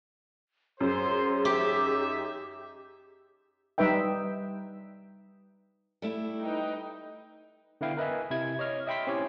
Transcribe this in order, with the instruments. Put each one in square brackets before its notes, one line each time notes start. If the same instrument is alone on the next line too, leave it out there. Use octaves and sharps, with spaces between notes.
[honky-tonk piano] F#2 [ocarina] G#4 [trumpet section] C5
[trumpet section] D#4 E5 [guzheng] G4
[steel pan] G3 D#4 B4 E5 G5
[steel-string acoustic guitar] G3 A3 E4
[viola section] D#4 B4 G5
[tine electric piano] D3 B3 E4 F5 G5
A#4 B4 D#5 E5 G#5
C3 E4 G#6
C#5 D#5 F6
D#5 E5 G5 B5 C6 B6
C4 C#4 E4 G4 C#5